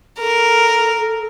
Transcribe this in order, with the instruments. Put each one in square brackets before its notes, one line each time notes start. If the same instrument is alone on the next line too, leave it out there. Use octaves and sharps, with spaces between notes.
[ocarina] A4 [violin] A#4